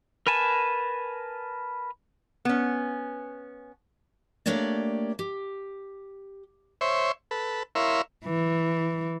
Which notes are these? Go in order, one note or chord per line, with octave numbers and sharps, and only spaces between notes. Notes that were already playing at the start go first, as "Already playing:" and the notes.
A#4 B4 G#5 A5
B3 C#4
A3 A#3 D4 G4 C#5 D5
G4
C5 C#5 E5
A4 B4
E4 A#4 C#5 E5 F5 C6
E3